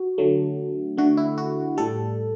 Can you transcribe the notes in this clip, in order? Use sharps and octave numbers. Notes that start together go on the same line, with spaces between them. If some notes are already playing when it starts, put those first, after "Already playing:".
Already playing: F#4
D3 F#3 A3
D3 A3 F#4
E4
F#4
A2 G3 A4